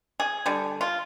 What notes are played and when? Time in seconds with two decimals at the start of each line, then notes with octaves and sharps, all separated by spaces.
0.20 G#4
0.46 D3 G3
0.81 F4